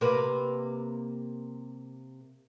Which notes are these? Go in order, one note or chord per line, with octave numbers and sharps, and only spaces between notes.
C3 A#3 B4